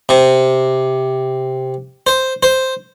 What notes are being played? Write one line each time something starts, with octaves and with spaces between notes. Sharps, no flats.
C3
C5
C5